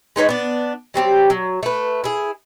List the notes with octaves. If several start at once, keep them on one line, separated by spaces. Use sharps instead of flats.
G#3 D#4 B4 C#5
B3 D4
F#3 G3 C4 G4
F#3
A3 B4
E4 G#4